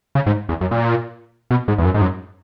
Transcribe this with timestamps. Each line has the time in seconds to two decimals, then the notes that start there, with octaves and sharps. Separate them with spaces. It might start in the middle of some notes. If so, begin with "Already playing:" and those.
0.15 C#3
0.26 G#2
0.49 E2
0.61 F#2
0.71 A#2
1.51 B2
1.68 G#2
1.78 E2
1.85 F#2
1.94 G#2
2.02 F#2